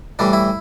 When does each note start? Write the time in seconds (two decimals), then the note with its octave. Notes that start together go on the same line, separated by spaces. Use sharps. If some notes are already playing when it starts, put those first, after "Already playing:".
0.19 A2 E3 G3 D4
0.33 E4